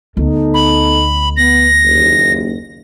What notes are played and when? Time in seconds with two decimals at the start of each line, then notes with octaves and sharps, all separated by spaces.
0.17 D2 B3 D#4 A4
0.54 B5
1.37 B3 A#6
1.82 F#1 D#2